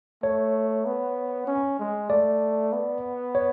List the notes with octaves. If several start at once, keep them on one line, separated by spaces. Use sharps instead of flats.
A3 C#5
B3
C#4
G#3
A3 D5
B3
C#5